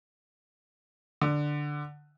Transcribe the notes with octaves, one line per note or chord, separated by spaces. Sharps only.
D3